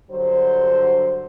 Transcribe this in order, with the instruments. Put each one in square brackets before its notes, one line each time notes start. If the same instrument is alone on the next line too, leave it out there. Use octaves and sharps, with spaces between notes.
[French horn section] G2 D3 F#3 C5